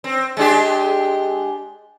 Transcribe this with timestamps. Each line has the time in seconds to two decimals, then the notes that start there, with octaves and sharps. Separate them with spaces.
0.04 C4
0.37 G#3 D4 G4